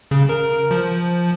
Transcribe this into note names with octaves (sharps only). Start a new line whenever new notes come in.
C#3
A#4
F3